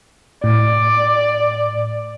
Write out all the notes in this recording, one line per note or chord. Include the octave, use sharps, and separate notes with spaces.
A2 D5